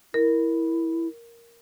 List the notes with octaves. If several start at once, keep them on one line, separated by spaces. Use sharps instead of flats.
E4 A#4